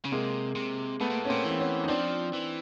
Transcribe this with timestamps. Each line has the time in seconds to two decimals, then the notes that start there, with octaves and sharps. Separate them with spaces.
0.05 C#3
0.12 C3 G#3 A#3
0.55 C3
1.00 B2 A3 B3
1.10 A#2
1.20 A2
1.25 C#4
1.29 A#2 A#3 C4
1.44 E3 C4
1.59 B3 C#4
1.84 D#4
1.88 F3 C4 D4
2.34 E3